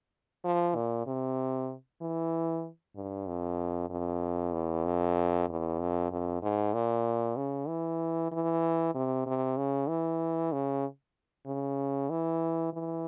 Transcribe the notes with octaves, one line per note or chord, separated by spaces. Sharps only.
F3
A#2
C3
E3
G2
F2
F2
E2
F2
E2
F2
F2
G#2
A#2
C#3
E3
E3
C3
C3
C#3
E3
C#3
C#3
E3
E3